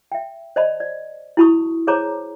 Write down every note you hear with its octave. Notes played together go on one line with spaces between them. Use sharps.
E5 G5
C5 D5 D#5 A5 B5
D5
E4 F#4 A5 B5 C#6 D#6
G#4 C5 C#5 A5 A#5 D6